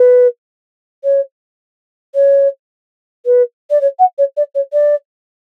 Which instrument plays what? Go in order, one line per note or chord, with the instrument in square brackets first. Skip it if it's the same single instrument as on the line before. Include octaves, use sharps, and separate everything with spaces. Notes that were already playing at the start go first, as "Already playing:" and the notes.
Already playing: [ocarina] B4
C#5
C#5
B4
D5
C#5
F#5
C#5
D5
C#5
D5